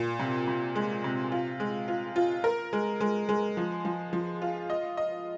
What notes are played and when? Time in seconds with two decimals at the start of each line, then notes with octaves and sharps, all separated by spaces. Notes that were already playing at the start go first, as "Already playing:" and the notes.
Already playing: A#2
0.19 C3
0.47 C3
0.76 G#3
1.04 C3
1.32 F4
1.60 G#3
1.88 F4
2.16 F4
2.44 A#4
2.73 G#3
3.01 G#3
3.29 G#3
3.57 F3
3.85 F3
4.13 F3
4.42 F4
4.70 D#5
4.97 D#5